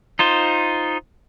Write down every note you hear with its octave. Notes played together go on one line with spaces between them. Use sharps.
D#4 F4 C5